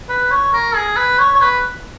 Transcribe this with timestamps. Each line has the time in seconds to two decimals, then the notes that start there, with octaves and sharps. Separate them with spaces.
0.09 B4
0.31 C#5
0.53 A#4
0.75 G#4
0.96 B4
1.19 C#5
1.34 C#5
1.41 B4